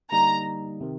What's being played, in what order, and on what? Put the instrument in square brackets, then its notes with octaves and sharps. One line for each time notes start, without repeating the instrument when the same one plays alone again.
[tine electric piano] D3 G3 A#3 D#4 [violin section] A#5
[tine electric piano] C3 D#3